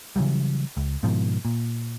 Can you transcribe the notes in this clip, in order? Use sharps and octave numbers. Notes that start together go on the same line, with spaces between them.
C#3 E3 F#3 G3
C#2
G#2 B2 D#3 F3
A#2